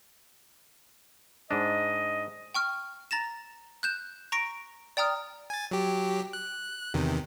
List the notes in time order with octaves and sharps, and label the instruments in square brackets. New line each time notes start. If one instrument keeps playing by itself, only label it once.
[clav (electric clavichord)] G#2 D4 [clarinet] D#5
[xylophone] G5 C#6 F6
A#5 A6 A#6 E7
F#6 G6 E7
A#5 C#6 A#6 D7
D5 G5 A#5 D#6 F6
[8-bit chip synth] G#5 A6
F#3 G4
F#6
E2 C3 D#3